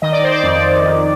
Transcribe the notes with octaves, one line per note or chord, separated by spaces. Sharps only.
D#3 D#5
D5
C5
D5
F2
D#3